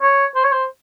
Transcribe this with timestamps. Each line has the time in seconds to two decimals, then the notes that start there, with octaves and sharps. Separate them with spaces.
0.02 C#5
0.35 C5
0.44 C#5
0.52 C5